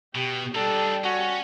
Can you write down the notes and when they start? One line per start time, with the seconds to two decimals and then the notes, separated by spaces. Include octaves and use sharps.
0.15 B2 G4
0.55 G3 D4 D#4 A4
1.04 C#4 F#4